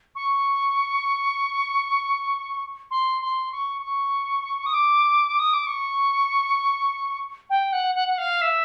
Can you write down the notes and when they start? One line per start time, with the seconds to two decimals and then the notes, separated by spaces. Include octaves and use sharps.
0.15 C#6
2.91 C6
3.22 C6
3.52 C#6
3.82 C#6
4.66 D#6
4.74 D6
5.39 D#6
5.53 D6
5.67 C#6
7.50 G5
7.72 F#5
7.95 F#5
8.08 F#5
8.18 F5
8.41 E5